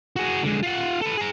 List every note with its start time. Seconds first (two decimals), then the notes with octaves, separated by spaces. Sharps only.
0.16 F#4 G#4
0.43 D3 G#3
0.63 F4 F#5
1.01 A4 B4
1.17 G#4 A#5